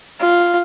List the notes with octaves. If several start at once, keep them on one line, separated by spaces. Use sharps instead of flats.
F4